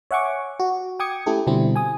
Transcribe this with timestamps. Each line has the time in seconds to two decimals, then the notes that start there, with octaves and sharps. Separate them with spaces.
0.11 C#5 E5 F#5 G#5 C#6 D6
0.60 F#4
1.00 G5 D6 D#6 G#6 C#7
1.26 A3 C#4 E4 G4 A4
1.47 B2 D3 G3 C4 E4
1.76 G#5 D#6